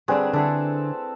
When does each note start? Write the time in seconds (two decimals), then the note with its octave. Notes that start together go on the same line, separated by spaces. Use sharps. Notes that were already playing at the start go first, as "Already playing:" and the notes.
0.08 D3 G3 C4 D4 G#4 B4
0.33 D3 D4 E4 G#4 A4 A5